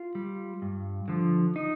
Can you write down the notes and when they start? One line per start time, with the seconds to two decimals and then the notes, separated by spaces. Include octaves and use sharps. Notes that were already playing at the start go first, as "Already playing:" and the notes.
Already playing: F4
0.15 G3
0.62 G2
1.08 D3 F3
1.56 D#4